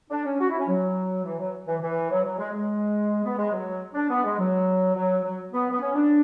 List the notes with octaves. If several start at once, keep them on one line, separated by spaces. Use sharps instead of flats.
D4
C#4
F#4
E4
C#4
F#3
E3
F#3
E3
E3
F#3
F#3
G#3
G#3
B3
G#3
F#3
D4
B3
G#3
F#3
F#3
F#3
B3
B3
C#4
D4